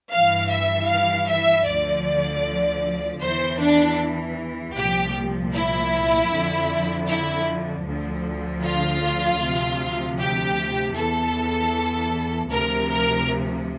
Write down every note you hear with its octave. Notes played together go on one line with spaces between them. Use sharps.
G2 E3 F5
E5
F5
E5
D2 D3 F3 D5
E2 E3 C5
D4
C2 A#2 F3 G4
E4
F2 D3 F3
E4
D2 D3 F3
F4
D2 C3 F3
G4
E2 E3 A4
D2 C3 F3 A#4
A#4